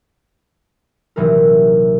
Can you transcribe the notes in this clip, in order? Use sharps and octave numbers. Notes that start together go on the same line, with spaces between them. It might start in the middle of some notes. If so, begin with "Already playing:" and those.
D#1 C3 E3 F#3 A#4